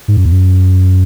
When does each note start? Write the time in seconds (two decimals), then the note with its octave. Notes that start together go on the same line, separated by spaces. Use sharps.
0.08 G#2
0.17 F#2
0.25 E2
0.32 F#2